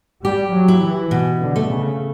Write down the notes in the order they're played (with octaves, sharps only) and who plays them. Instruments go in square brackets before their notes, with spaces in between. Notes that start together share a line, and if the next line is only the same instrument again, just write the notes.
[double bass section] G3 [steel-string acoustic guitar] G4
[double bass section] F#3
[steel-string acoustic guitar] E4
[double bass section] E3
[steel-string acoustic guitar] B2
[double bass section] D3
[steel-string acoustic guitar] A3
[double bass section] C#3